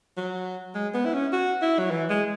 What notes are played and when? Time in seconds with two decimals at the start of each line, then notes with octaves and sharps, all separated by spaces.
0.17 F#3
0.75 G#3
0.94 B3
1.06 E4
1.14 C#4
1.33 F#4
1.62 E4
1.79 F#3
1.91 E3
2.10 G#3